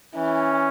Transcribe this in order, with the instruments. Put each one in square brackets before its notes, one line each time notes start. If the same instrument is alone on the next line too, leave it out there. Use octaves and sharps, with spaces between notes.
[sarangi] E3 [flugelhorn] C#4